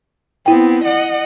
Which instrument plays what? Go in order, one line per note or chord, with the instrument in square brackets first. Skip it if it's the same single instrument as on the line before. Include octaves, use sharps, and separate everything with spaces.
[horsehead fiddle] B3 C4 [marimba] E4 G5
[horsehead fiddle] D#5 F#5